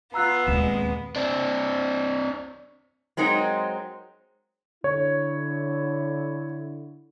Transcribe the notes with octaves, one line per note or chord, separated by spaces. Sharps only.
B3 F4 A#5 E6 F#6
D#2 A#2 G#3 C4 E7
C4 D4
F#3 G#3 C4 D#4 A#4
D3 E4 C#5